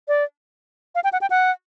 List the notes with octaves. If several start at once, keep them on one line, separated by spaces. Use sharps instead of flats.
D5
F5
G5
F#5
G5
F#5